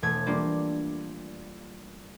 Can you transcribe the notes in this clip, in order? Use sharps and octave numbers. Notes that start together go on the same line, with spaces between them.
E1 A3 G#6
G3 A#3 D4 F4